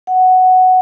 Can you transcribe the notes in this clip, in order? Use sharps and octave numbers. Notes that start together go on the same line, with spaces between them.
F#5